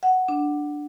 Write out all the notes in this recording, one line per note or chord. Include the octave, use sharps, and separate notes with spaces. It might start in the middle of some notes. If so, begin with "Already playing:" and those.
F#5
D4